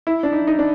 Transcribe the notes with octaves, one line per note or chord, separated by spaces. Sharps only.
E4
D4
D#4
D#4
D4